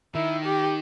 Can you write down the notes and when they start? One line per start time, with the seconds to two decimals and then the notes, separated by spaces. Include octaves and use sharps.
0.15 D#3 E4
0.46 G4